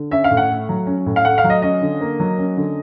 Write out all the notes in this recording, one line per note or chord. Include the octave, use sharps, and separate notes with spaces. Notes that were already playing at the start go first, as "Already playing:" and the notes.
Already playing: D3
C#4 E5
F5
A2
F#5
A3
F#3
C#4
A2
F5
A3 F#5
F5
F#3
D#5
C#4 D#5
D3
A#3
F#3
C#4
D3